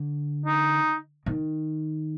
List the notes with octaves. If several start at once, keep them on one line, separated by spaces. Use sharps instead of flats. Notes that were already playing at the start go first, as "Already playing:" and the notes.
Already playing: D3
D#4
D#3